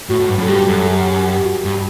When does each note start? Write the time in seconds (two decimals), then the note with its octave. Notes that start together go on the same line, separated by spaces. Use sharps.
0.09 A2 F#4
0.20 A2
0.28 G2
0.38 F#2 A4
0.48 G2 G4
0.68 F#2 A4
0.80 A4
0.87 G4
1.26 G4
1.45 F#4
1.65 G2 G4